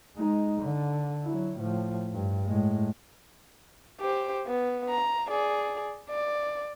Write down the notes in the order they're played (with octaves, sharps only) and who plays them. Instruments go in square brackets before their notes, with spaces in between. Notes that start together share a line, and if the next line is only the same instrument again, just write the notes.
[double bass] G#3 D#4
D3
F#3 E4
A2 F3
G2
A2 G#3
[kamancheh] G4 C5
B3
A#5
G#4 D5
D5